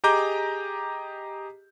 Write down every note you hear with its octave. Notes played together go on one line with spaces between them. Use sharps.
G4 G#4 D#5 A#5 D6 G6